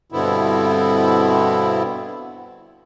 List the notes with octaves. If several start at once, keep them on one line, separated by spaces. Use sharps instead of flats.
G2 B2 D3 B3 C4 E4